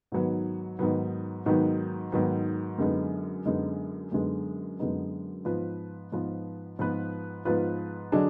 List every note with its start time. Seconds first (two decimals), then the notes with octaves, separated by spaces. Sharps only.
0.12 G#2 D#3 F#3 B3
0.79 G#2 D#3 F#3 B3
1.46 G#2 D#3 F#3 B3
2.12 G#2 D#3 F#3 B3
2.78 F#2 D3 G#3 B3 D#4
3.46 F#2 D3 G#3 B3 D#4
4.12 F#2 D3 G#3 B3 D#4
4.79 F#2 D3 G#3 B3 D#4
5.45 G#2 F3 B3 F4 B4
6.12 G#2 F3 B3 F4 B4
6.79 G#2 F3 B3 F4 B4
7.45 G#2 F3 B3 F4 B4
8.12 D3 F#3 D4 G#4 D#5